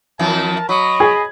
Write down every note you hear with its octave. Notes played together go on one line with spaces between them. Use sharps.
F2 E3 B3 A#4 A5
F#3 D#5 B5 C#6
G#4 G#6